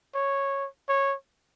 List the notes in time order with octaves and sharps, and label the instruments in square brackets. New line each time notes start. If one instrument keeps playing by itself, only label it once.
[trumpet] C#5
C#5